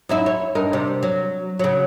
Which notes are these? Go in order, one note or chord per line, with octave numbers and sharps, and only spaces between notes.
F#2 D#4 E4
C#5
G2 D#4 A#4
C3 G3
F#3
C#3 F#3